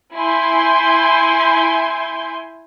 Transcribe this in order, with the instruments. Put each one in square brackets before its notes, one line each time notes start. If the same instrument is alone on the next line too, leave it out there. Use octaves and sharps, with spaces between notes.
[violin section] E4 G#5 C6 G6